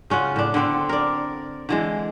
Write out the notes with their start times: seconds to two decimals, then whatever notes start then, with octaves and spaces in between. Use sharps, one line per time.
0.10 C#3 C#4 F4 F#5
0.36 A2 D4
0.54 D3 B3 C4 A4
0.89 A#4 D5
1.69 D3 E3 G#3